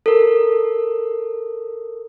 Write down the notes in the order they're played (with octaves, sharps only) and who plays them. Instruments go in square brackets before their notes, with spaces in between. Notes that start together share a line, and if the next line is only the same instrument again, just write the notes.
[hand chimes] A4 A#4